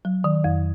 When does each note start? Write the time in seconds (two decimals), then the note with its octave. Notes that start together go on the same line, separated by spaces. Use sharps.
0.05 F#3
0.24 D#3
0.44 F2